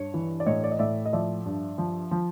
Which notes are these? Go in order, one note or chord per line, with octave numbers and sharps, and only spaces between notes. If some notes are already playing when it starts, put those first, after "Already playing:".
Already playing: G2 C#5
E3
D5
A2 C#5 D#5
D5
D#5
A2 D5 E5
D#5
F3 D5 E5
G2
F3
F3